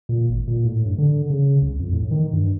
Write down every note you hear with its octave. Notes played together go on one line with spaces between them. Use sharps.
A#2
G#1
A#2
A2
G2
D3
C#3
C2
F2
A2
D#3
G2